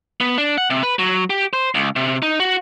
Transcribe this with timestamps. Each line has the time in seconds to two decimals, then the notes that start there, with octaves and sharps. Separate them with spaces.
0.21 B3
0.38 D4
0.58 F#5
0.70 C3
0.83 B4
0.99 F#3
1.30 G4
1.53 C5
1.75 C#2
1.96 C3
2.22 D#4
2.40 F#4